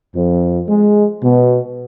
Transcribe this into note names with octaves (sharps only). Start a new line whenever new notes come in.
F2
G#3
B2